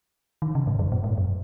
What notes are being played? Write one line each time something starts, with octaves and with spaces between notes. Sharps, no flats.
D#3
C#3
G#2
F#2
A#2
G#2
F#2